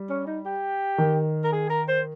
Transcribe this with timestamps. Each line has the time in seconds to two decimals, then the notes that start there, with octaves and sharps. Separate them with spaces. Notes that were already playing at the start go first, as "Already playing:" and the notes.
Already playing: G3
0.10 C#4
0.27 D#4
0.45 G4
0.98 D#3
1.44 A#4
1.52 G#4
1.70 A#4
1.88 C5